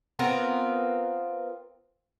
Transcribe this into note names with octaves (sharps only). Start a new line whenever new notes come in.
B3 C4 F4 A#4